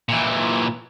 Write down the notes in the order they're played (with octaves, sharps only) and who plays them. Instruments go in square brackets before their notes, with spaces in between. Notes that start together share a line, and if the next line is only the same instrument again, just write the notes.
[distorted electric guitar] A#2 E3